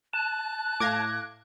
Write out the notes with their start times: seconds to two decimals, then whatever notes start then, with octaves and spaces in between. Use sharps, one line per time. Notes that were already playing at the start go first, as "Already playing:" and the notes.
0.13 A5 F#6
0.80 A2 F5 D6 G#6 A#6